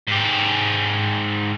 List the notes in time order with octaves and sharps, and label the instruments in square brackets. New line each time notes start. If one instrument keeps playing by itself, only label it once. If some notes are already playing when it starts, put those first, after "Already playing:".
[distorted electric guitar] G#2 G4